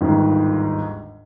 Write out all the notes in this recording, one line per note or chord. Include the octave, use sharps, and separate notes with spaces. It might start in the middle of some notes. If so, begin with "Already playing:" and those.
G1 D#2 G#2